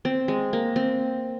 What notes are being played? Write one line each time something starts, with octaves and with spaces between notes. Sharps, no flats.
C4
G#3
A#3
C4